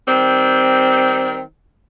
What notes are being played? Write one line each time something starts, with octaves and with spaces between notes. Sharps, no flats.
D#3 G3 C4